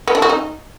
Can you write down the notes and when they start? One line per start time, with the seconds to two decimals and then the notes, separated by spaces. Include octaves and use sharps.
0.08 B3
0.15 D4
0.22 F#4
0.29 D#4